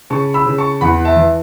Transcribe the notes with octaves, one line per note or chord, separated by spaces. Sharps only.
C#3 A5 C#6
B5 E6
C#3
A5 C#6
E2 F#5 B5
E5 A5
E3